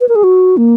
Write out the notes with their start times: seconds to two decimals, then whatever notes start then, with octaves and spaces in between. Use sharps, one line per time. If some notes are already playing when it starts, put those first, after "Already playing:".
0.01 B4
0.09 A#4
0.15 G#4
0.23 F#4
0.57 A#3